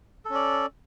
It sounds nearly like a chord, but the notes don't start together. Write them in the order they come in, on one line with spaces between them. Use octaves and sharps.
A4 C#4 D5